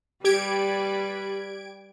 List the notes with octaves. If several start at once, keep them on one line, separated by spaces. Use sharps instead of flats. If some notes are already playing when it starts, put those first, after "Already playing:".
G3 G4 B4 D5 G#6 D7